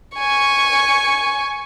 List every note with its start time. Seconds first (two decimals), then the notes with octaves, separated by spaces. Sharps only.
0.17 G#5 C#6